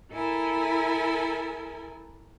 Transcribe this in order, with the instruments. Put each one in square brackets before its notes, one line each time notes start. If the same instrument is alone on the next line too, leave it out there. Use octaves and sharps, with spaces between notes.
[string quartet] E4 A4 A#4 G#5